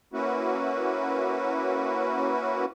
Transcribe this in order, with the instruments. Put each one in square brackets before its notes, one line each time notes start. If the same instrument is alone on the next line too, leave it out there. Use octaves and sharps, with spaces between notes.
[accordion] A#3 C#4 E4 F#4 B4